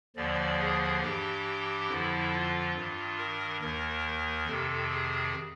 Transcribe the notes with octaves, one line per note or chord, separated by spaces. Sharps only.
D#2 D3 F3 D5
G#4
G2 E3 G4
F2 D3 F3 E4
F4
G2
D#3
A#4
D#2 D#3 A#4
F2 C3 D#3 A4
G#4